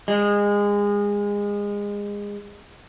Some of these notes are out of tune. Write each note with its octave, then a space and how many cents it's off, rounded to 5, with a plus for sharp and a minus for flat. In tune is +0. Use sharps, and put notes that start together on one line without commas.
G#3 -25